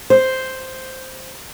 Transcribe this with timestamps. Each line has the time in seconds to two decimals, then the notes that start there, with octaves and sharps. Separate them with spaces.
0.10 C5